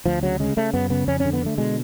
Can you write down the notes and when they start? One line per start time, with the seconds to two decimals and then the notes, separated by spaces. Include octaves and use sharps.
0.06 D2 F3
0.22 C#3 F#3
0.40 C#3 G#3
0.57 C#3 A3
0.74 F#2 B3
0.90 C#3 B3
1.08 F2 C#4
1.20 C#4
1.25 D3
1.33 B3
1.42 D3 A3
1.58 B2 G#3